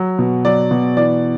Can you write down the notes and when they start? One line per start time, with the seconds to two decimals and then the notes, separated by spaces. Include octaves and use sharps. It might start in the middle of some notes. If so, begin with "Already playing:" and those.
Already playing: F#3
0.19 B2
0.45 F#3 D5
0.71 B2
0.96 E3 D5